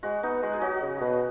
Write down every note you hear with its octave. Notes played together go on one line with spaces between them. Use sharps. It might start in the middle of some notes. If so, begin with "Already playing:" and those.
G#3 F#4
B3 D#4
G#3 F#4
G#4
F#3 F#4
C#3
B2